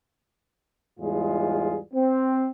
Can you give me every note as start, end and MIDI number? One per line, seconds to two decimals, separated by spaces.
0.99 1.78 40
0.99 1.78 44
0.99 1.78 55
0.99 1.78 56
0.99 1.78 65
0.99 1.78 68
1.94 2.48 60